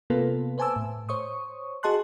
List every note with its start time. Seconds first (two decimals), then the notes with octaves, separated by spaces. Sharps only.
0.10 C3 A#3 B3 F4 A4 B4
0.58 B4 C5 G#5 A5 D6 E6
0.76 A2
1.09 C5 C#5 C#6 D#6
1.83 F#4 G#4 D#5 A5 C6 F#6